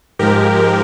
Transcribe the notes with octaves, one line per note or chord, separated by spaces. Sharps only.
G#2 F3 G#3 G4 A#4